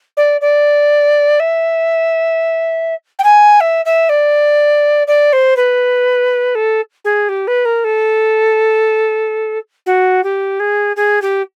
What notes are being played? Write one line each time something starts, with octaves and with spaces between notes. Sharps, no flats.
D5
D5
E5
G5
G#5
E5
E5
D5
D5
C5
B4
A4
G#4
G4
B4
A#4
A4
F#4
G4
G#4
G#4
G4